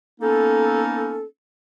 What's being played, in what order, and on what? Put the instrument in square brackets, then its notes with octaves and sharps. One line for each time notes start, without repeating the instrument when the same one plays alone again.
[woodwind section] A#3 B3 C#4 D#4 A4